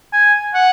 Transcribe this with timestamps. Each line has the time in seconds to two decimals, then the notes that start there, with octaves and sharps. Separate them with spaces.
0.13 G#5
0.54 F#5